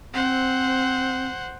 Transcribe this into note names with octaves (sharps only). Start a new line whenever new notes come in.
C4 C5 F#5